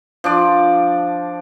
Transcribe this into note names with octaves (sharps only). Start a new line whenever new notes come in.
F3 D4 D5